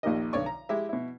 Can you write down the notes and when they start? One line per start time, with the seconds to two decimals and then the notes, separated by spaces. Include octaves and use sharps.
0.03 A#1 D#2 D#3 G4 A#4 D#5
0.33 B1 D3 C#5 D5 C#6
0.46 A#5
0.69 G#3 E4 G4 E5
0.89 B2 E4